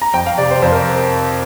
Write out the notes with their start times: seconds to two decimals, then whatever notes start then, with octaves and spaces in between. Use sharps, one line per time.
0.02 A#5
0.14 F2 G5
0.26 F5
0.38 C3 D5
0.51 C5
0.62 F2 C5
0.72 A#4